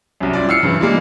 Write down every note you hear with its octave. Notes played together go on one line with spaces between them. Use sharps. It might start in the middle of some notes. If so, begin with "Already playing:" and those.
C2 F#2
E4 F4 D5
E6 F6 C7 C#7
G2 C#3 E3
G3 G#3 A#3